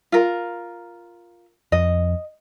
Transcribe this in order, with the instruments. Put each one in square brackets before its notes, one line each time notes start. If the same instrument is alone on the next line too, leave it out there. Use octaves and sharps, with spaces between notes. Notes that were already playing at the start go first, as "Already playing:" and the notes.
[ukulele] F4 A#4
[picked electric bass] F2 [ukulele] D#5